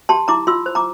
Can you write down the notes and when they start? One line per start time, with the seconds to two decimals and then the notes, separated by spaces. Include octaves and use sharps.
0.09 G4 A5 C6
0.28 E4 A#5 D6
0.47 F4 C6 E6
0.66 C5
0.75 A#5 D6